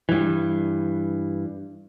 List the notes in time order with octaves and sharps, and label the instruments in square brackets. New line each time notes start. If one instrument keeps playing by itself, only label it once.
[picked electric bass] G2 E3